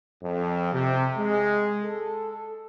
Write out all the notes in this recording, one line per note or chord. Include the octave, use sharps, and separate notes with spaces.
F2
C3
G#3
A4